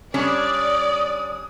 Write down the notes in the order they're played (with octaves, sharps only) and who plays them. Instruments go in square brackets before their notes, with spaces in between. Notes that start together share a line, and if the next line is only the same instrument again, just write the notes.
[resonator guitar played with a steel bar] G3 C#4 D4 [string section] D5 [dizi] D#6